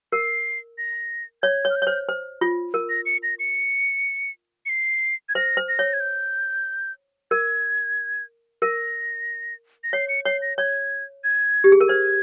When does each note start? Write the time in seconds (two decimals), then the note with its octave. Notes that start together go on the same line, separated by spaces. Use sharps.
0.12 A#4 C7
0.78 A#6
1.42 C#5 G#6
1.65 C#5
1.70 F6
1.76 G6
1.82 C#5
1.87 C5
2.09 C5
2.41 F4
2.74 A#4
2.89 A#6
3.06 C#7
3.23 A#6
3.39 C#7
4.66 C#7
4.69 C7
5.29 G#6
5.35 C5 A#6
5.57 C5
5.68 A#6
5.79 C#5
5.93 G#6
6.00 G6
7.31 A#4 G#6
8.62 A#4 A#6
9.84 A#6
9.93 C#5 C7
10.09 C#7
10.25 C#5 C7
10.42 A#6
10.58 C#5 G#6
11.24 G#6
11.64 G4
11.72 G#4
11.81 A#4
11.88 C5 G#6